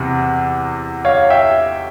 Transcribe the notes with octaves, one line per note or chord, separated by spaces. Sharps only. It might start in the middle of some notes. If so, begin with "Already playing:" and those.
Already playing: E2 C3
C#5 F5
E5 G5